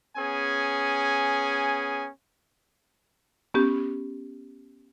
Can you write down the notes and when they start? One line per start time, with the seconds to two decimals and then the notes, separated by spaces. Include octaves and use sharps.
0.17 B3 C#4 G#4 G#5
3.54 B3 C#4 G4